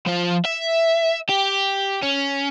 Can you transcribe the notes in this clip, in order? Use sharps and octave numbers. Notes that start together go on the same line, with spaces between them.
F3 F4
E5
G4
C#4